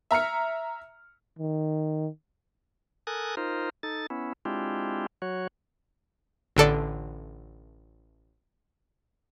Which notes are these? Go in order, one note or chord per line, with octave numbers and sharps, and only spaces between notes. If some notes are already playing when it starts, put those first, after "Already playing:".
E5 A#5 F6 C#7
D#3
A4 A#4 G#5 D#6 F#6
D#4 F4 A#4 C5
D#4 A4 A6
B3 C#4 E4
G#3 C4 D4 E4 F4 G4
F#3 F#4 C#5
A1 D3 A4 D5